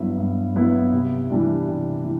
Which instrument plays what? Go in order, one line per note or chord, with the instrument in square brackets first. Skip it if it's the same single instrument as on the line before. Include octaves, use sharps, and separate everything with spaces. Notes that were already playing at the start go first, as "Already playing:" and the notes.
Already playing: [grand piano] G2 F#3 B3 E4
G2
F#3 B3 E4
C3
E3 G3 D4
C3
E3